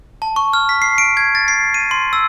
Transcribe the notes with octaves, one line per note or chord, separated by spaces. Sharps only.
A5
C#6
F6
B6
C7
D7
G#6
A6
C7
D#7
C6
E6